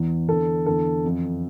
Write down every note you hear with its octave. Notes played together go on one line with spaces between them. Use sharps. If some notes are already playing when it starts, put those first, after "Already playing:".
Already playing: E2 E3
E2 D3 A4
E2 D3 A4
F2 E3